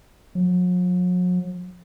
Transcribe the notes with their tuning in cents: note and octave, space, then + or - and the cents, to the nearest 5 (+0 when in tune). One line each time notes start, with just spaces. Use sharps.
F#3 -45